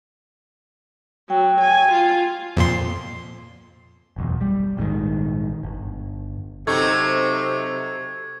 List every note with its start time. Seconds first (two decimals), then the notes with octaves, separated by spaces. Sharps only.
1.30 F#3 G5
1.61 G#5
1.93 F4
2.57 F2 A#2 C6
4.16 F#1 B1 E2
4.41 G3
4.77 A#1 G#2 B2 D#3
5.63 G1
6.67 C3 F#3 C4 D#4 A4 C#6 G#6